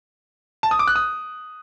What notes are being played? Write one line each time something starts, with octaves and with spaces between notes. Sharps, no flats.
A5
D#6
D6
F#6
D#6